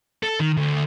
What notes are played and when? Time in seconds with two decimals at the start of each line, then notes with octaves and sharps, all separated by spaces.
0.23 A4
0.40 D#3
0.57 D2